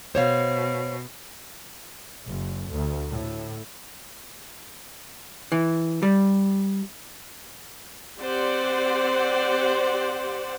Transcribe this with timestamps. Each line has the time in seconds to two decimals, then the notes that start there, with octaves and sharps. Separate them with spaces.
0.15 B2 C5 C#5 F5
2.27 F#1
2.72 D2
3.10 A2
5.52 E3
6.03 G3
8.18 C4 G4 C5 D5 F#5